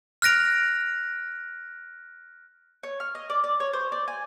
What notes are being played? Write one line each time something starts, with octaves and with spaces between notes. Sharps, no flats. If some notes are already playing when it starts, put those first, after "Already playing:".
F6 F#6 A#6 D7 F7
C#5
F6
D#5
D5
D5
C#5
C5
D5
G#5